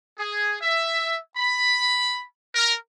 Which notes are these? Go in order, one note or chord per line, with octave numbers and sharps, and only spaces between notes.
G#4
E5
B5
A#4